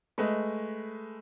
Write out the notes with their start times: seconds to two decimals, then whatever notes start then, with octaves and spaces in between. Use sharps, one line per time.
0.18 G#3 A3 B4 D#5